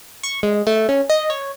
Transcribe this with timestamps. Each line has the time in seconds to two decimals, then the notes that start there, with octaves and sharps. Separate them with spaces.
0.23 C#6
0.43 G#3
0.67 A3
0.89 C#4
1.10 D#5
1.30 C#5